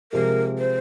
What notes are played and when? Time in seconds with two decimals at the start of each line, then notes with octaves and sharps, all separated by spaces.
0.12 C3 F3 G#3 A#4
0.58 C5